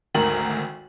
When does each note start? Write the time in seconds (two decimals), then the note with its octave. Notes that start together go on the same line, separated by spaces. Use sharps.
0.15 G#1 D2 D#3 A#4 F#7